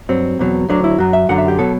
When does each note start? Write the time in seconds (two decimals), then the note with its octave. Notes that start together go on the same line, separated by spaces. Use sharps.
0.09 G2 F#3 C4
0.39 E2 B2 F#3
0.68 D2 D3 F#3 D4
0.84 E4
0.98 F#2 F#3 F#4
1.13 E5
1.29 F#2 D3 F#3 F#5
1.38 E5
1.48 G4
1.59 B2 F#3 A4